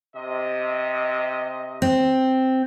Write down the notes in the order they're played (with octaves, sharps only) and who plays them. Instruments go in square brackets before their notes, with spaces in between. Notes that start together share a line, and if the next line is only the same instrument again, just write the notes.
[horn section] C3 D#5
[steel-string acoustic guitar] C4